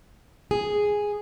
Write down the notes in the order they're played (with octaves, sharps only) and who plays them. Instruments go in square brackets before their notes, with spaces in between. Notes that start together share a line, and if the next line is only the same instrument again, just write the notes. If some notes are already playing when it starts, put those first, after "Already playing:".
[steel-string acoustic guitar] G#4